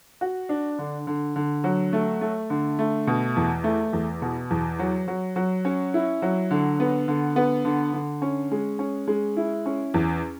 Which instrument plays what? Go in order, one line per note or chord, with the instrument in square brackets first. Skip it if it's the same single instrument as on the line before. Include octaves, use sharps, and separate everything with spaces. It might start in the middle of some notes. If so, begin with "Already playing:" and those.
[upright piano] F#4
D4
D3
D3
D3
F#3
A3
A3
D3
A3
B2
E2
A3
E2
B2
E2
F#3
F#3
F#3
C#4
E4
F#3
D3
B3
D3
B3
D3
D3
C#4
G#3
C#4
G#3
E4
C#4
E2